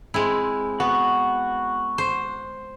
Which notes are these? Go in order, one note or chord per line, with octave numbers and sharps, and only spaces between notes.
G#3 C4 E4
B3 F#4
C5